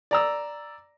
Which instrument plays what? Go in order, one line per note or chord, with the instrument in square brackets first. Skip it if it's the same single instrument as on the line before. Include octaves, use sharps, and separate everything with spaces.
[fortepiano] D5 A#5 E6